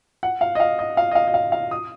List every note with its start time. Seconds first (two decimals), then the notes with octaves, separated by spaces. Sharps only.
0.23 F#5
0.41 F5
0.55 D#5
0.60 F5
0.79 D#5
0.97 F5
1.11 D#5
1.15 F5
1.27 D#5
1.34 F5
1.52 F5
1.71 D#6